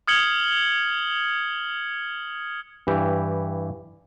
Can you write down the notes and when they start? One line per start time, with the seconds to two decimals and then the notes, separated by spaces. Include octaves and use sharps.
0.07 D#6 F6 G#6 C#7 F#7 G7
2.87 G2 E3 G4